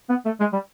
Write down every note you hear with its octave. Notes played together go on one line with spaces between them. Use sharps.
B3
A3
G#3
G3